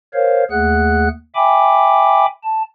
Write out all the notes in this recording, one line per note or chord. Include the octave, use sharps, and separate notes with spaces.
A#4 C5 C#5 F5
D#2 A3 G#4 F#5 F#6
E5 G5 G#5 B5 D6
A5